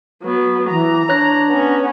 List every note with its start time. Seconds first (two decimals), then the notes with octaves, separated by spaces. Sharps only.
0.23 F#3 B3
0.70 E3 A#5
1.09 D4 C#5 F#6 A#6
1.50 B3 C#4